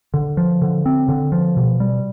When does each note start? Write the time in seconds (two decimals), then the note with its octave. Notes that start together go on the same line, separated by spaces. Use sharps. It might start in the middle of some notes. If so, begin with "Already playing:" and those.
0.14 D3
0.37 F3
0.62 D3
0.86 C4
1.09 D3
1.32 F3
1.57 B2
1.80 G3